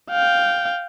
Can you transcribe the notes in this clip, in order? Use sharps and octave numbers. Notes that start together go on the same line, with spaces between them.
F5 G5